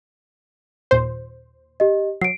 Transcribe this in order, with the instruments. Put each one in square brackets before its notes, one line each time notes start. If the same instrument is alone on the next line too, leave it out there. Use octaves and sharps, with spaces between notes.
[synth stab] D#2 A#2 C5
[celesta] G4 D#5
[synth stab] F#3 [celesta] C7 D7